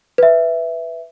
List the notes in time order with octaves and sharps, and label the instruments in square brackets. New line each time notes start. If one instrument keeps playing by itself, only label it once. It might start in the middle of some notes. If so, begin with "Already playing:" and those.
[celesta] B4 E5